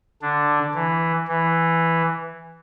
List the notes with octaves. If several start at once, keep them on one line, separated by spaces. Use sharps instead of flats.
D3 D4
E3
E3